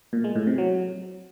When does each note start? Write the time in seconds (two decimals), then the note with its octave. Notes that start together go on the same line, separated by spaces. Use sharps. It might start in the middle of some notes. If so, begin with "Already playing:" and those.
0.13 A#2
0.24 G#3
0.35 A2
0.47 C3
0.58 F#3